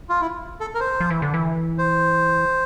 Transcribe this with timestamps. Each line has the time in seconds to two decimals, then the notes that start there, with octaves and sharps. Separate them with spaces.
0.09 F4
0.21 E4
0.60 A4
0.75 A#4
0.80 C5
1.00 F3
1.10 E3
1.22 D3
1.34 E3
1.78 C5